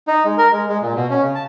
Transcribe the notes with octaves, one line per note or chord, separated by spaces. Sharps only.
D#4
G#3
A#4
G#3
G#3
A#2
B2
C#4
C#3
A5